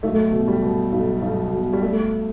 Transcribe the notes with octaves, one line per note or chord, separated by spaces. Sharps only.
B1 A3
B2
G3
B2
B1
B1
B2
G3
A3